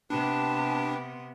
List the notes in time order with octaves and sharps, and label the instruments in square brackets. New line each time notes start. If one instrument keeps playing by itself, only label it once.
[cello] C3 B3 [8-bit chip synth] D4 [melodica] G4 B4 [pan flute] A5